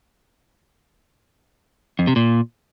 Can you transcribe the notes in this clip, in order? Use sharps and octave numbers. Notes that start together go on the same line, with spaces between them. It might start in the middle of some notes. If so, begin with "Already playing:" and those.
F2
C3
A#2